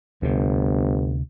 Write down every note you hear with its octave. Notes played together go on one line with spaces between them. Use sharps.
G1 D2 C3